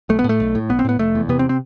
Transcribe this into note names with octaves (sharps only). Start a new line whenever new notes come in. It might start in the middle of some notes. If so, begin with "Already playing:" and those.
B1 A3
B3
A2
A3
B1
A2
B1 B3
C4
A2 B3
F1 A3
E2
C3 B3
C4
C4